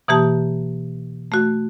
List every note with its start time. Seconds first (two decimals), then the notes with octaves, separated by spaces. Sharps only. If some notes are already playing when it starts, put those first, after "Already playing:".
0.08 B2 E3 A#3 G4 A5
1.32 A3 F#4